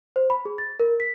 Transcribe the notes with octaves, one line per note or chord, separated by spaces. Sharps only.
C5
B5
G#4
A6
A#4
B6